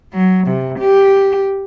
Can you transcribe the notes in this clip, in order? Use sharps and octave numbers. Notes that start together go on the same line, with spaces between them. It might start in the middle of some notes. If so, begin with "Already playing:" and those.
F#3
C3
G4